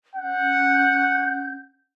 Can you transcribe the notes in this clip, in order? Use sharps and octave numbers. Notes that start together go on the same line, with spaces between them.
C#4 F#5 G6